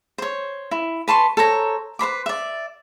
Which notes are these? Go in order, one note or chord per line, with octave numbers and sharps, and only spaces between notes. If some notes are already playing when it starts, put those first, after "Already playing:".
C5 C#5
E4
B4 A5 C6 C#6
A4 C5 C#5 A#5
B4 C5 B5 D6
D5 E5